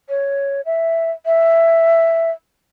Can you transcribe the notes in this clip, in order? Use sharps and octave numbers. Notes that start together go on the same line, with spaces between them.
C#5
E5
E5